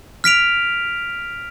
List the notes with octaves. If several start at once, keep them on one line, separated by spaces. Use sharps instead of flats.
F6 B6 D7 F7